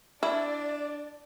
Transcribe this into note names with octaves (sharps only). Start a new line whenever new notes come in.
D4 E4 D5